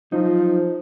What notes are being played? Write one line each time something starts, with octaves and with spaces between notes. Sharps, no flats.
F3 F#3 D#4